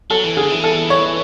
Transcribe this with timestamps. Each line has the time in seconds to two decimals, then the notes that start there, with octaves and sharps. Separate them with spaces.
0.10 F#3 A4
0.24 E3
0.37 D3 G#4
0.50 E3
0.64 A4
0.90 C#5